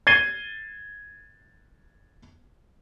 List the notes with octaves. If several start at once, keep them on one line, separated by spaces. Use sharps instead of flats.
G#6 A6 C7 D#7 G7